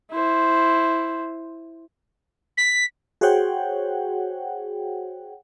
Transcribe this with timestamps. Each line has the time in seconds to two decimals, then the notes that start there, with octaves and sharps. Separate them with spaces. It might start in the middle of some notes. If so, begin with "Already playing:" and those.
0.12 E4 C5
2.57 B6
3.21 F#4 G#4 C5 C#5 F#5 G5